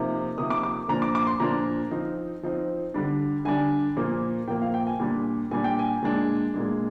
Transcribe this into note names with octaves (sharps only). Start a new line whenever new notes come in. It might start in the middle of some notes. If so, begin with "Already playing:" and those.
Already playing: C3 F3 A#3 D#4
C3 F3 A#3 D#4 D#6
D6
D6
A#2 F3 A#3 D4 A#5
D6
D6
C6
A#2 F3 A#3 D4 A#5
F3 C4 D#4
F3 C4 D#4
D3 G3 D4
D3 G3 D4 G#5
A#2 F3 A#3
A#2 F3 A#3 G5
F5
G5
G#5
A#2 G3 D4
A#2 G3 D4 G#5
G5
G#5
A#2 G#3 D4
A#2 G#3 D4